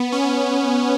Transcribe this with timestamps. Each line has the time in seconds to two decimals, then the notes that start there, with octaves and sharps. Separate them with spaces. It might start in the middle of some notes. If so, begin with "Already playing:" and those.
Already playing: B3
0.12 C#4